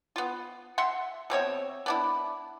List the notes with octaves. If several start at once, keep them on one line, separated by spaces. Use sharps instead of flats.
B3 F4
E5 F#5 C6
B2 C4 C#5 E5
B3 D4 E4